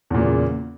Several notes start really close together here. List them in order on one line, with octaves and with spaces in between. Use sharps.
E2 A#2 C#3